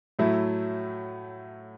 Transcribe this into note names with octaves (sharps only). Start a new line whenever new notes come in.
A2 F#3 A3 E4